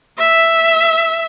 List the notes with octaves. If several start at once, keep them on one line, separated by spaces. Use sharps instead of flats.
E5